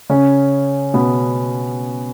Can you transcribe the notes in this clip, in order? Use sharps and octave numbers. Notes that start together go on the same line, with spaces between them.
C#3 C#4
B2 B3